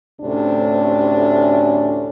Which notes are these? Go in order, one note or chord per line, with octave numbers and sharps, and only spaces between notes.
D2 A2 C3 C#4 D4